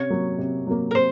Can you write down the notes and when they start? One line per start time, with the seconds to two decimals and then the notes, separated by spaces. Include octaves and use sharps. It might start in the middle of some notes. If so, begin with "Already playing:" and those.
Already playing: C3 C#4 C#5
0.10 F#3 A#3
0.38 C3
0.67 F#3 A#3
0.91 A#4
0.94 C3 C5